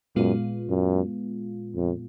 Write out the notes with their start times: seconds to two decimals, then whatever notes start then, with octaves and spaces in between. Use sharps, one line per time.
0.16 F#2 A#2 G#3 B3 F4
0.69 F#2
1.75 F2